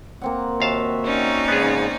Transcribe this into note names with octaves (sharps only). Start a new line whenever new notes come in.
A#3 C4 F#5
D#2 F#4 E5 F5 A5
C#4 D#4 D5
G#2 C#3 G#3 B3 G#4